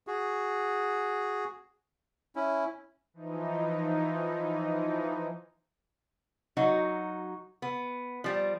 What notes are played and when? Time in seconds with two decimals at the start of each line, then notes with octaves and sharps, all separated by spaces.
0.07 F#4 G#4
2.36 C#4 E4
3.14 E3 F3 D#4
6.57 F#3 D#4 F#4
7.62 B3
8.24 F3 G3